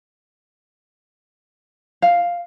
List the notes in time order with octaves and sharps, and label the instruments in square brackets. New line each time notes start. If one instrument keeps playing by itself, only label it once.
[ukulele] F5